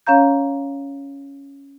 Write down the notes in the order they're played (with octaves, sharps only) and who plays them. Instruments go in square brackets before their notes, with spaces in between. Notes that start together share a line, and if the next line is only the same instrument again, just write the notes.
[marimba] C#4 C#5 F5 A#5 G6